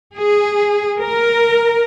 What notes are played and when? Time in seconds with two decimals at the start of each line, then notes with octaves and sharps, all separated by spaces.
0.15 G#4
0.99 A#4